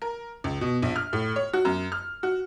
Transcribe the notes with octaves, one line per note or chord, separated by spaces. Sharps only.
A#4
C#2
B2
A#1
F6
A2
C#5
F#4
F#2
F6
F#4